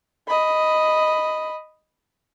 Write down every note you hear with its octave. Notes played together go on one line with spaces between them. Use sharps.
D#5 B5